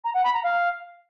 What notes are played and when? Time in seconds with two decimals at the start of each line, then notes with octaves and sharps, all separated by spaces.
0.04 A#5
0.14 F#5
0.24 B5
0.34 A#5
0.43 F5